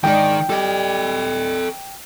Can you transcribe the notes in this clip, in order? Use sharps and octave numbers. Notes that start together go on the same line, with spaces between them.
G#2 D#3 D4 D#4 G5
G3 A4 D#5